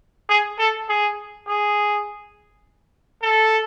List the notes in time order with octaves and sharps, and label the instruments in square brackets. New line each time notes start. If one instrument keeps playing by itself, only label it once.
[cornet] G#4
A4
G#4
G#4
A4